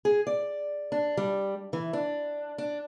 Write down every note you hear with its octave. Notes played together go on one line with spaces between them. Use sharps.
G#4
D5
D4
G3
E3
D4
D4